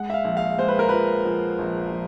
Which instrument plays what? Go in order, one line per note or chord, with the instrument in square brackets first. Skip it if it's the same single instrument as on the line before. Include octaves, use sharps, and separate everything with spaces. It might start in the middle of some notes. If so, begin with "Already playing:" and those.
Already playing: [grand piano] G#3 F#5
E5
F5
A#1
F5
G#3 C5
B4
A#4
F3 B4
F3
A#1
F3